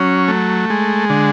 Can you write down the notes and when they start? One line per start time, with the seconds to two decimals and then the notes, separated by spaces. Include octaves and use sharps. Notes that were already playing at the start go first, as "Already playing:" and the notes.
Already playing: F#3 C#4
0.28 A3
0.70 G#3
1.10 D3